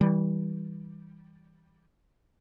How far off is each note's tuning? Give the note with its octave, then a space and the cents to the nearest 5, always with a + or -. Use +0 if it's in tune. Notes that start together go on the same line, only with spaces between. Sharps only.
E3 -30 G3 +0